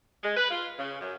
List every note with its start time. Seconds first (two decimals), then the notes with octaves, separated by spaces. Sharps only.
0.23 G#3
0.37 B4
0.51 F4
0.79 C#3
1.01 F#2